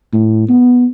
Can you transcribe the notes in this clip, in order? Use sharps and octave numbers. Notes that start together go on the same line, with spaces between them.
A2
B3